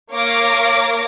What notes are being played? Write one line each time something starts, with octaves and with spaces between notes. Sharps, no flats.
A#3 A#4 C#5 F5 D6 A#6